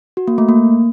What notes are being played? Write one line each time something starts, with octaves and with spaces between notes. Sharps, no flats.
F#4
A#3
A3
A#3